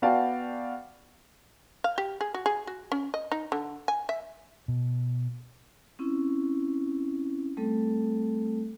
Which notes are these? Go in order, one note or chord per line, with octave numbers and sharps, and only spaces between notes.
B3 F#4 D5 F5 G5 A5
F5
G4
G#4
F#4
G#4
F#4
C#4
D#5
D#4
D3
G#5
E5
B2
C4 C#4 E4
G3 A3 C4 A4